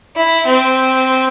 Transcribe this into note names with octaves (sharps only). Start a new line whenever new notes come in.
E4
C4